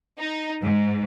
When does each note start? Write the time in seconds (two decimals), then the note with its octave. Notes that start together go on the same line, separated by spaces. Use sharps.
0.19 D#4
0.63 G#2